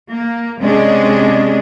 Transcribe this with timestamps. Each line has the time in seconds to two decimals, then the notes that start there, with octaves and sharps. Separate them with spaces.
0.12 A#3
0.60 C3 G#3 C#4 D4 G#4